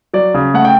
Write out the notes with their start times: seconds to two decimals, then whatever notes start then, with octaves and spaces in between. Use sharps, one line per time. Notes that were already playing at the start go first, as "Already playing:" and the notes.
0.14 F#3 D5
0.34 C#3
0.54 A3 F#5
0.65 G5